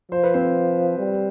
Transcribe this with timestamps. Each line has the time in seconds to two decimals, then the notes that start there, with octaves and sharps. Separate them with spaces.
0.12 F3 C5
0.24 B4
0.34 C4 C5
0.99 G3